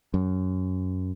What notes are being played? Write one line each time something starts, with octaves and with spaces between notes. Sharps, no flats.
F#2